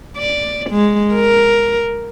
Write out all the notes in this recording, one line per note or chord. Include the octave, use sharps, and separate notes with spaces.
D5
G#3
A#4